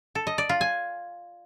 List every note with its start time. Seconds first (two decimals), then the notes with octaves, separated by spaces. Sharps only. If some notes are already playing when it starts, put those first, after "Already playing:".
0.15 A4
0.27 D#5
0.38 D5
0.49 F4
0.61 G#5